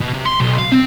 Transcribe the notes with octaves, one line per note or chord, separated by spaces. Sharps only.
B2
C3
C6
B1
F5
C4